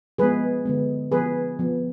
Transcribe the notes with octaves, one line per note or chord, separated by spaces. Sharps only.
F3 G#3 B3 G#4 B4
D3 G#3 B3
F3 B3 G#4 B4
F3 B3